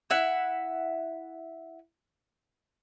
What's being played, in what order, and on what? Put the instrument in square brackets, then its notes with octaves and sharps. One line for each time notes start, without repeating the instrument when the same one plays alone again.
[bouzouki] E4 E5 F#5